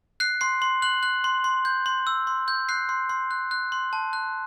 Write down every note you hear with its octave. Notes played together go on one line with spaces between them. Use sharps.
F#6 C7
C6 C7
C6
F#6 F#7
F#6
C6
C6
G6
C6
E6
C6
G6
F#6 C7
C6
C6
F#6
F#6
C6
A5
F#6